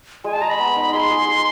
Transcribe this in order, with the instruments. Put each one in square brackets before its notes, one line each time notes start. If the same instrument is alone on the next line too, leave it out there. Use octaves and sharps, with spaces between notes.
[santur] G#3 [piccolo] G#5
[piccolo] A5
[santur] G#3 [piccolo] A#5
[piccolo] B5
[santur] B3
D#4
[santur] G#4 [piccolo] C6
[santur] G#4
G#4